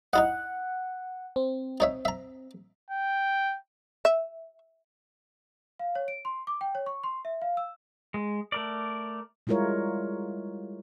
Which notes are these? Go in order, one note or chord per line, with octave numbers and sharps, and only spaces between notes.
D#4 E4 D#5 F#5
C4
D#4 C#5 E5
E5 A#5
G5
E5
F5
C#5
D7
C6
D6
G5
C#5
C#6
C6
E5
F5
E6
G#3
A3 A#4 D5
G3 G#3 E4 F4 A#4 C#5